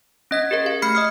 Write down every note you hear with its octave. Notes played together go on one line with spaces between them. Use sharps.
C#4 D#5 B6
G4 G#4 A#4 D#5
F5
A3 B5 F6 C7 C#7
D#5 D#6 F6